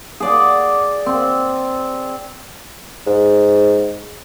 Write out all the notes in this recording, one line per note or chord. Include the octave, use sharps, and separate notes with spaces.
G#4 D5 F#5
C4
G#2